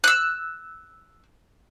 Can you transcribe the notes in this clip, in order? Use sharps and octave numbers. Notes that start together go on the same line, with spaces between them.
E6 F#6